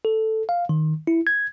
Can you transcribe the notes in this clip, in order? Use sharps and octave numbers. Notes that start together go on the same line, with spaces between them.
A4
F5
D#3
E4
G#6